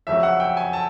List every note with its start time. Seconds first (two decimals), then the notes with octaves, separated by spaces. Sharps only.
0.07 F2 C#3 F#3 E5
0.23 F#5
0.40 G5
0.57 G#5
0.73 A5